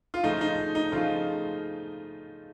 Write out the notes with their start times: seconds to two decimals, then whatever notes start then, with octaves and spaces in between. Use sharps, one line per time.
0.14 F4
0.23 C#3 F3 A3 D#4
0.41 D#4
0.75 D#4
0.92 C#3 F3 A3 F4